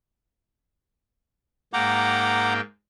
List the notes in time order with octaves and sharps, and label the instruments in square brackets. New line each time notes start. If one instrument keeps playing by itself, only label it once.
[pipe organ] G#2 A#3 G5 [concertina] F#5 A#5 D6